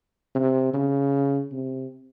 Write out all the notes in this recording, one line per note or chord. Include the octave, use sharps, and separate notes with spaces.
C3
C#3
C3